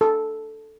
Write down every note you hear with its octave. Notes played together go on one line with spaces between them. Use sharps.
A4